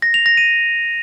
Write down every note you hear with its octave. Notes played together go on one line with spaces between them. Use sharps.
A#6
F7
A#6
D#7